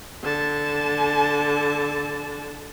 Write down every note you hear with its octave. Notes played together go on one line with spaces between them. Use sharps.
D3 A5